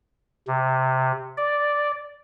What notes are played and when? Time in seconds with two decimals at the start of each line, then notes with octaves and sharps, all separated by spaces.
0.47 C3
1.37 D5